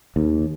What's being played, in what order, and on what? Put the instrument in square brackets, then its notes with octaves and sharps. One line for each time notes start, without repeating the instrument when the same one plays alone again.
[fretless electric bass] D#2